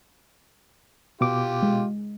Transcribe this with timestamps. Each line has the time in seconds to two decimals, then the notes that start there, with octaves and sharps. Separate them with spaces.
1.21 B2 F4 G4 D6
1.63 G#3